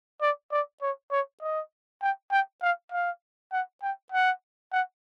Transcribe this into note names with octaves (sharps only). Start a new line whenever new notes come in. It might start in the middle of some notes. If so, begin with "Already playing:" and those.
D5
D5
C#5
C#5
D#5
G5
G5
F5
F5
F#5
G5
F#5
F#5